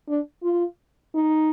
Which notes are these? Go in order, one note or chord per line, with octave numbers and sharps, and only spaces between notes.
D4
F4
D#4